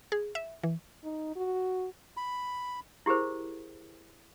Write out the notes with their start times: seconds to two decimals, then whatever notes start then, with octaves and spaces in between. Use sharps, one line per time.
0.12 G#4
0.35 E5
0.63 E3
1.04 D#4
1.36 F#4
2.17 B5
3.06 E4 G4 G#4 A#4 C5